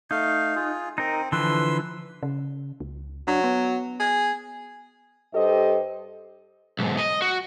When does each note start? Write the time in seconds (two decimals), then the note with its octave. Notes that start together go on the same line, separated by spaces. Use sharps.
0.11 A3 D#4 F5
0.55 F4 G#4
0.98 C4 D#4 A#4
1.32 D3 E3 F3 B4 C6 E6
2.23 C#3
2.80 C#2
3.28 F#3 D4
3.44 B3
4.00 G#4
5.34 G2 G4 A4 C5 D#5
6.79 B1 G#2
6.98 D#5
7.22 F#4